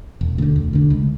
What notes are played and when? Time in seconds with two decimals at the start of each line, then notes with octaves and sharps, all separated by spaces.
0.21 E1
0.38 D2 D3
0.56 E1
0.73 D2 D3
0.90 C#2